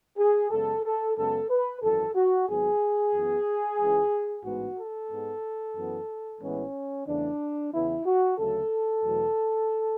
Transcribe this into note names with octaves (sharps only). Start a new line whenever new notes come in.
G#4
F#2 C#3 G#3 B3 A4
A4
F#2 C#3 G#3 B3 A4
B4
G#1 F#2 E3 A4
F#4
G#1 G#2 F#3 B3 G#4
F#2 E3 B3
C#2 C#3 E3 G#3
A1 G#2 G#3 B3 F#4
A4
G#2 G#3 B3
F#2 E3 B3
A1 A2 E3 G#3 B3 C#4
E2 C#3 E3 A3 D4
E2 C#3 E3 B3 E4
F#4
D2 C#3 F#3 A3 A4
E2 B2 F#3 A3